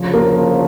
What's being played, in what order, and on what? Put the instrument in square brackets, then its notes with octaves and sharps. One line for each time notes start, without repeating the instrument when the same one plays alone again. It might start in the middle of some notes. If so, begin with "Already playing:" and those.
Already playing: [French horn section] D2 C#3 F3
[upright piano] A#3